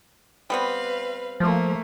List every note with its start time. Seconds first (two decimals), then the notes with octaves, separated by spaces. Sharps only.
0.50 G3 B3 C4 B4 F5
1.40 F3 A3 A#3